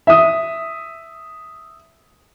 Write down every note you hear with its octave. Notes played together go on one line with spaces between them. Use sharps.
E5 D#6